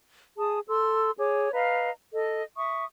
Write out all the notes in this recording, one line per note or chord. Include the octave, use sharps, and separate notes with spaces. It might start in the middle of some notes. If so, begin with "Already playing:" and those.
G#4 A5 D#6
A4 C6 E6
G#4 C#5 D6
B4 D#5 F5 A#5
A4 D#5
E5 C#6 D#6